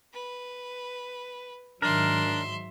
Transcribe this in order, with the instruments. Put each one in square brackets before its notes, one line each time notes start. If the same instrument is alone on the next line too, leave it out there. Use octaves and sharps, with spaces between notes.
[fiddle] B4
[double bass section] G#2 D#3 F#3 [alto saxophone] D4 [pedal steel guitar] A#4 [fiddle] E5 C6